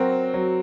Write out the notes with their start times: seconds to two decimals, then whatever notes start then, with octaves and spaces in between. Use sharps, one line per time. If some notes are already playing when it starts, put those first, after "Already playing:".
Already playing: F#3 C4 F#4 A#4
0.34 F#3